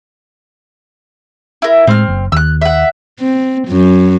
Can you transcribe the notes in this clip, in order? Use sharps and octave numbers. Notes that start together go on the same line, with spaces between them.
E4 A#4
A2 G#3 C4 F6
F#1
D#2 E6 F#6
E5 F#5
C4
F#2